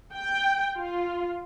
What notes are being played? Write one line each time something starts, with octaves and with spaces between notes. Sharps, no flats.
G5
F4